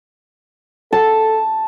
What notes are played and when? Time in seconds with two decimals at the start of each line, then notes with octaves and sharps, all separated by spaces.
0.92 A4 A5